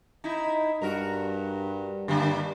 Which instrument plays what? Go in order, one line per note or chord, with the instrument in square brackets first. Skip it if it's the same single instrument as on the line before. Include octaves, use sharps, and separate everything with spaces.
[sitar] D#4 E4
[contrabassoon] G2 [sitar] F#4 A#4
[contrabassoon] G2 [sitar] D3 A#3